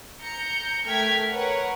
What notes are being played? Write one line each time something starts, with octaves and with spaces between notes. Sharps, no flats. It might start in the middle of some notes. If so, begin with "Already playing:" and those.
A#5 G6 C#7
A3 A#4 G5 F6 G#6 B6
A#4 B4 C#5 F#5